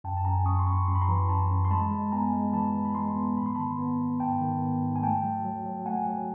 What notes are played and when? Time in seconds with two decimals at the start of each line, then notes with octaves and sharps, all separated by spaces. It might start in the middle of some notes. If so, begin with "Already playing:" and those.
0.04 F#2 G5 A5
0.17 A5
0.25 F#2 G#5 A#5
0.45 F#2 C#6 D#6
0.59 C6
0.67 F#2 B5 C#6
0.87 F#2 C6
0.95 B5
1.02 A#5 C6
1.08 E3
1.29 F#2 A5 B5
1.50 F#2
1.65 C6
1.71 G#3 A5 B5
1.91 G#3
2.12 B3 G#5 A#5
2.33 G#3
2.53 E3 A5 B5
2.74 E3
2.85 B5
2.95 G#3 A#5 C6
3.16 B3
3.37 G#2 B5
3.46 C6
3.55 D#3 A5 B5
3.79 B3
3.99 B3
4.20 G#2 G5 A5
4.41 D#3
4.62 B3
4.82 G#2
4.96 G#5
5.03 A3 G5 A5
5.24 F#3
5.44 F#3
5.66 F#3
5.86 A3 F#5 G#5
6.06 F#3